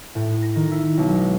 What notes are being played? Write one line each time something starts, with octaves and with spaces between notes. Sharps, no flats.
A2
A#6
D#3
E4
B1
G#3